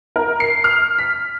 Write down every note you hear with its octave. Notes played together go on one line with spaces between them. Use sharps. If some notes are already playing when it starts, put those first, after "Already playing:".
A#4
C7
F6
B6